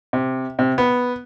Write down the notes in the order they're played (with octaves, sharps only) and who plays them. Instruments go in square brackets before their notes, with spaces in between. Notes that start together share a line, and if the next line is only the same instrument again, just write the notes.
[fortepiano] C3
C3
B3